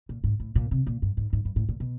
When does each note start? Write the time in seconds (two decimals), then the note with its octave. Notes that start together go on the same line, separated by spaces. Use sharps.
0.09 A#2
0.24 G#2
0.40 A2
0.55 A#2
0.71 C3
0.87 A#2
1.02 G2
1.17 G#2
1.33 G#2
1.45 G2
1.56 A2
1.69 A#2
1.80 B2